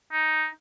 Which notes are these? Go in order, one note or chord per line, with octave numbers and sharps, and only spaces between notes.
D#4